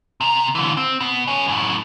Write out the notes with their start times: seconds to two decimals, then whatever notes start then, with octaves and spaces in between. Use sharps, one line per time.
0.21 C3 A#5
0.55 D3 E3
0.77 C4
1.00 B2
1.28 A3 C#4
1.47 F#2 A2